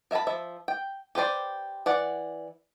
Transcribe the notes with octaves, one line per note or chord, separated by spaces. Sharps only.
A#4 E5 G#5 A5 B5
F3 E5
G5
G4 B4 C5 D5
E3 D5 F#5